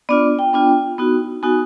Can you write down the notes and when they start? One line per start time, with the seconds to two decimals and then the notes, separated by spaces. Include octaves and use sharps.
0.09 B3 D4 F4 D5
0.39 G5
0.53 B3 D4 F4
0.98 B3 D#4 F#4
1.43 B3 D#4 F#4 G#5